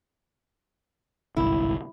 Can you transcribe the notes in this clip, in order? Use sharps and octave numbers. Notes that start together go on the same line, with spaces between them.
G1 C2 G#2 E4